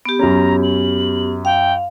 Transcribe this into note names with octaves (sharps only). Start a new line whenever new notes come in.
B3 G4
F#2 C#4 A#5
F#7
F5 G5